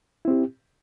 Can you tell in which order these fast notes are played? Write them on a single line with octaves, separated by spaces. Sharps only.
E4 C4 G4